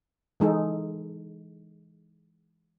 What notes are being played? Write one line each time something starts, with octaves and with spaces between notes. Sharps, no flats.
E3 G#3 D#4 A4